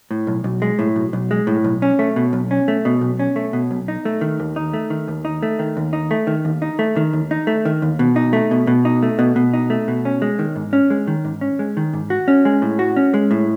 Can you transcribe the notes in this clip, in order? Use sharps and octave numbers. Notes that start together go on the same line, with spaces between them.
A2
B1
B1
G#3
A2
B1
B1
G#3
A2
B1
C#4
A3
B2
B1
C#4
A3
B2
B1
C#4
A3
B2
B1
D#4
A3
D#3
D#2
D#4
A3
D#3
D#2
D#4
A3
D#3
D#2
D#4
A3
D#3
D#2
D#4
A3
D#3
D#2
D#4
A3
D#3
D#2
B2
D#4
A3
B2
B2
D#4
A3
B2
B2
D#4
A3
B2
C#4
G#3
D#3
G#2
C#4
G#3
D#3
G#2
C#4
G#3
D#3
G#2
F#4
C#4
G#3
A2
F#4
C#4
G#3
A2